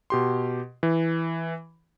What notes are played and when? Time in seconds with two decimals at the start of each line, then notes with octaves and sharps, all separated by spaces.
0.10 B2 G4 C6
0.83 E3